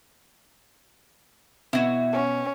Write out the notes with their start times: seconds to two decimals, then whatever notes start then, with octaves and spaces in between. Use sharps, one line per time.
1.73 B2 E4 F#4
2.13 C#4